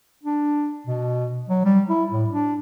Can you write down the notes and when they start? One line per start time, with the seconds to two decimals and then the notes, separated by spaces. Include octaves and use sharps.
0.23 D4
0.87 B2
1.49 F#3
1.65 G3
1.89 E4
2.12 A2
2.30 D4